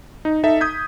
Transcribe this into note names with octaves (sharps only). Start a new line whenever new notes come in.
D#4
D#4 A4 E5
D#6 G6 G#6 B6